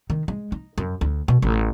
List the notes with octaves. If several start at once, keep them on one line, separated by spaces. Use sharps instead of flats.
D#3
G#3
D#4
F#2
D2
B2
A1